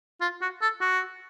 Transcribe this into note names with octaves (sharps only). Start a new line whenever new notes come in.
F4
F#4
A4
F#4